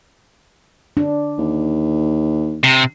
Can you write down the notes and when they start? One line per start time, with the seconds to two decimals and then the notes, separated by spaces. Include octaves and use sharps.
0.97 D4
1.38 D#2
2.64 C3